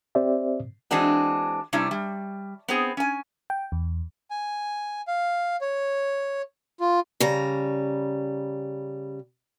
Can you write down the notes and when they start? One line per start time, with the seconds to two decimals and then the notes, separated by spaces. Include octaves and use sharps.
0.15 C4 G4 C5 D5 E5
0.91 E3 G#3 C4 D4 F#4
1.73 C3 G3 C#4 D4 E4
1.91 G3
2.68 B3 C4 G#4
2.97 C#4 G#5
3.50 G5
3.72 E2
4.31 G#5
5.08 F5
5.61 C#5
6.80 F4
7.20 C#3 G3 A#5